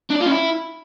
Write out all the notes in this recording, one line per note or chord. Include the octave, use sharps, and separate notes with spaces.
D4
D5
F4
C#4
E4